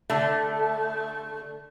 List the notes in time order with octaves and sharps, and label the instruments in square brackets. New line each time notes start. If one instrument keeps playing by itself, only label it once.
[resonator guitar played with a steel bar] D3 A3